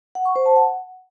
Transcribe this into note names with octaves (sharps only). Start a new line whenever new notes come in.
F#5
C#6
C5
A5
F#5